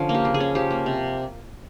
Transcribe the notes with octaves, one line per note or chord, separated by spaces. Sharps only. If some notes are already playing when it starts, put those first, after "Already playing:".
Already playing: D3 F3 C#4
A#3
G4
C#3
G#4
C#4
F3 G4
A#3
C3